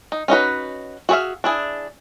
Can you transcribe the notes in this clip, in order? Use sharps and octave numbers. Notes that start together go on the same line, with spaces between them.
D#4
C#4 D#4 F#4 B4
F#4 G#4 C#5 E5 F5
D4 E4 G#4